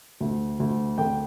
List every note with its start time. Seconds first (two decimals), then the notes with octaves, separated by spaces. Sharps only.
0.20 D2
0.60 D2
0.98 D3 G5